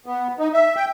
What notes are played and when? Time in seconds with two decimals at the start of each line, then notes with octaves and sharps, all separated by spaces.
0.06 B3
0.39 D#4
0.53 E5
0.76 G5